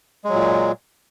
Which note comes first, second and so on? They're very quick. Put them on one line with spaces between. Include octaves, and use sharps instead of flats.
G#3 F#3 A#2